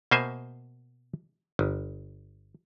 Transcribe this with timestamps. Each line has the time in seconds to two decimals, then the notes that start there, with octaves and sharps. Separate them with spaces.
0.11 B2 A#3 C5 E5 G#5
1.59 G1